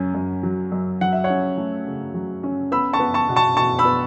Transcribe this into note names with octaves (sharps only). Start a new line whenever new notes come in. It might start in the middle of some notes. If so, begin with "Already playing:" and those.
Already playing: F#2 C#4
F#2
F#3
F#2
F#3 F#5
E5
C#5 F#5
C#4
A3
C#3
F#3
C#4
B3 B5 E6
A5 C#6
B3
A5 C#6
B2
A5 C#6
B2 A5 C#6
B5 E6
B3